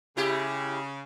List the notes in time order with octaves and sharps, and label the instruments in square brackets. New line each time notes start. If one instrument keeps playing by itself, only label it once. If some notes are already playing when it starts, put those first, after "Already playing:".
[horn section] C#3 [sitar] G#3 E4 G4